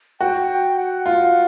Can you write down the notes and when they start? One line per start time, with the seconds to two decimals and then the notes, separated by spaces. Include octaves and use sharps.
0.21 F#4 G5
0.49 G5
0.77 F#5
1.06 F4